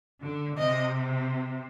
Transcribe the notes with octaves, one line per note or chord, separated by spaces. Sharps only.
D3
C3 D#5